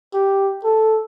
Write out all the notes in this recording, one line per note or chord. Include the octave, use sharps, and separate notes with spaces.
G4
A4